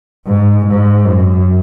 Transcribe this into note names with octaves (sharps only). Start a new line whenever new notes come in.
G#2
G#2
F#2